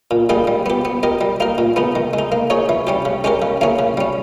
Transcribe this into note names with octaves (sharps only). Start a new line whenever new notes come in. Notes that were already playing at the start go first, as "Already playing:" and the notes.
A#2
G3 A#3 D#4 G#4
G3
B3 G4
B3
G4 A#4 D#5
G3
A#3 D#4 A#4
A#2
G#3 B3 D#4
D#3
G#3
D#4
A#3
D#4 G#4 C#5
E3
G3 C#4 G4
C#3
G#3 C#4 G4 A#4
C#3
E3 A#3 C#4 G#4
C#3
G3 C#4